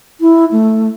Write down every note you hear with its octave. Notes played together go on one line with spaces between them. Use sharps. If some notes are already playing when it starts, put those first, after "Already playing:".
E4
A3